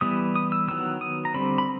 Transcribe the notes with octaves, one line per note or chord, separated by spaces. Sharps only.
E3 G3 B3 D#6
D#6
E6
D#3 F#3 B3 E6
D#6
A#5
D3 G3 C4 B5
B5